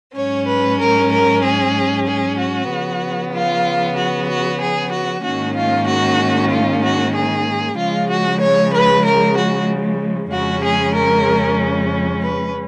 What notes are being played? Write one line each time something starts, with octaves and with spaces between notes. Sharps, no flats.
G#2 F#3 C#4 C#5
B4
A#4
A#4
G#4
G#4
F#4
C#3 F3 B3
F4
F#4
F#4
G#4
F#4
G#2 D#3 A#3 C#4 F#4
F4
F#4
F4
F#4
G#4
C#3 F3 G#3 F4
F#4
C#5
B4
A#4
F#4
F2 C#3 G#3 C#4 F#4
G#4
A#4
B4